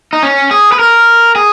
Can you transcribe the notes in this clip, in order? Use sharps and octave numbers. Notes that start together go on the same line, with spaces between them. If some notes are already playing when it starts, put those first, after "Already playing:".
D#4
C#4
G#4
B4
A#4
G#4